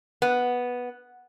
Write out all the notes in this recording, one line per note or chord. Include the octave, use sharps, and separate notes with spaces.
B3